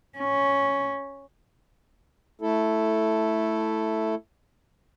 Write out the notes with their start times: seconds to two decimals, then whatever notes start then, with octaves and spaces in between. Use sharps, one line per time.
0.18 C#4
2.41 A3 E4 A4